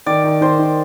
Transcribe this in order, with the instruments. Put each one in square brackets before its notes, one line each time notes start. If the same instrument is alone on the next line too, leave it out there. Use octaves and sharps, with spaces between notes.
[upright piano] D#3 [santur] D5
[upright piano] D#3
[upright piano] D#3 [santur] C5
[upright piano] D#3